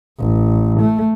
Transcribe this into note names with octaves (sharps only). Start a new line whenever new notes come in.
A1
A3